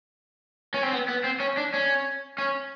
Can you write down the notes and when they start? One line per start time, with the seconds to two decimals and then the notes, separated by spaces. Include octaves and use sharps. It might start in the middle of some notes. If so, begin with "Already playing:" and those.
0.74 C#4
0.83 C4
0.92 B3
1.09 B3
1.24 C4
1.40 C#4
1.57 D4
1.74 C#4
2.38 C#4